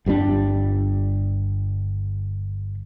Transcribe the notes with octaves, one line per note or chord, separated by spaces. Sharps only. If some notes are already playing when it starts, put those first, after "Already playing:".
G1 G3 C4 D4